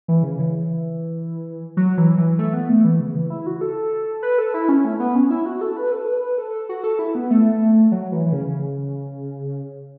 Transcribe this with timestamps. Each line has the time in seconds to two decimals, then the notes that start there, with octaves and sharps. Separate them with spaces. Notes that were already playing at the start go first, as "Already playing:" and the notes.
0.08 E3
0.23 C#3
0.39 E3
1.77 F#3
1.98 E3
2.18 E3
2.39 A3
2.54 B3
2.69 A3
2.85 E3
3.00 C#3
3.16 E3
3.30 E4
3.46 F#4
3.61 A4
4.22 B4
4.38 A4
4.54 E4
4.69 C#4
4.85 A3
5.00 B3
5.15 C#4
5.30 E4
5.46 F#4
5.61 A4
5.77 B4
5.92 A4
6.08 B4
6.38 A4
6.69 F#4
6.84 A4
6.99 E4
7.15 B3
7.30 A3
7.92 F#3
8.12 E3
8.26 E3
8.33 C#3